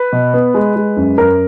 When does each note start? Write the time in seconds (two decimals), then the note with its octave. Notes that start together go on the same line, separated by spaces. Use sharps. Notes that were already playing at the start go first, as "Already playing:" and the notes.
Already playing: B4
0.12 B2
0.34 B3
0.54 G#3
0.76 G#3
0.97 F#2
1.18 F#2 A#4